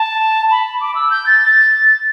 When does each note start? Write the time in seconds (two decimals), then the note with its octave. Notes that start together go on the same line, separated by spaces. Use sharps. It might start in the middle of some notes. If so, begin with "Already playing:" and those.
Already playing: A5
0.51 B5
0.81 D6
0.95 E6
1.11 G6
1.26 A6